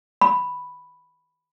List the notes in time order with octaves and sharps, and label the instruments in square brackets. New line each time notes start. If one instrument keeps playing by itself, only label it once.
[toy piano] B5